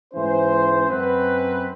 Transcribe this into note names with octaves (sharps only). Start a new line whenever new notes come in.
G#2 E3 C#4 C5
F#2 C4 B4